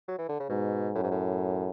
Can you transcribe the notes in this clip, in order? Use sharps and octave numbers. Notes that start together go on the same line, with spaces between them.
F#3
E3
D3
C#3
G#2 B2
F#2 A2
G#2
A2